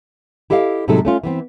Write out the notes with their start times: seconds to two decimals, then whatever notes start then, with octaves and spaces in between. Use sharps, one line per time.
0.50 E4 G4 A4 D#5 F5
0.88 A2 C3 F#3 G#3 D#4 A4
1.05 A3 C#4 F4
1.23 E3 B3 C4